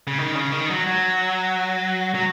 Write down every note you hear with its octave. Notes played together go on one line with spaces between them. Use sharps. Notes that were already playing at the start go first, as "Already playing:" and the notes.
C#3
D#3
C#3
D#3
F#3
F#3
F#3